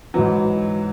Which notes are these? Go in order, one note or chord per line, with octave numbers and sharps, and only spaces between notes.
G#2 E3 F#3